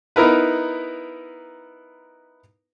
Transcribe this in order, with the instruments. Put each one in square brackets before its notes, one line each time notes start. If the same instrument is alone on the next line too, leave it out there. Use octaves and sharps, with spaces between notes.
[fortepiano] B3 D#4 E4 A#4 B4